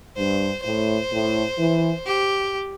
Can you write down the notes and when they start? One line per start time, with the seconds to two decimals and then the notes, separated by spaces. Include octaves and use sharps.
0.16 G2 C5
0.64 A2 C5
1.11 A2
1.59 E3
2.06 G4